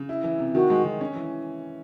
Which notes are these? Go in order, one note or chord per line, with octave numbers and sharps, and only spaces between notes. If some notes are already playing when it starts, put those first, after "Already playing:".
Already playing: C#3
E4
E3
C3
D#3 F#4
G#3
D#3
C#4
E3